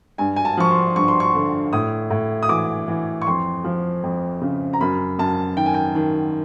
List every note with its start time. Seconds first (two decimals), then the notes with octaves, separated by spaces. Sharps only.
0.18 G2 G#5
0.36 G#5
0.45 A5
0.57 F3 C#6
0.71 C6
0.96 G2 C#6
1.08 C6
1.20 C#6
1.34 D3
1.73 A2 D#6
2.10 A2
2.43 D#6
2.49 E3 D6
2.88 E3
3.22 C#6
3.27 F2 C6
3.64 F3
4.03 F2
4.41 C#3
4.73 A#5
4.81 F#2 B5
5.19 F#2 A5
5.57 D#3 G5
5.66 G#5
5.74 G5
5.95 D#3